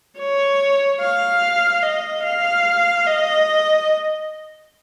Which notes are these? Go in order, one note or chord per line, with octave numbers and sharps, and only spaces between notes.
C#5
F5
D#5
F5
D#5